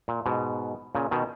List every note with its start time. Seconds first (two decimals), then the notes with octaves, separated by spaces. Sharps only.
0.08 A#2
0.26 G#2 B2
0.95 A#2 C#3
1.11 B2 D#3